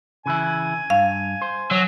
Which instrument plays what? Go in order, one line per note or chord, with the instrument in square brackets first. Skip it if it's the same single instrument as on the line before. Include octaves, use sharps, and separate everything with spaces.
[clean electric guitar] C#3 E3 E4 [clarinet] G#5
[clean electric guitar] G2 [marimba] F5
[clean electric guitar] C5
[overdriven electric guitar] F#3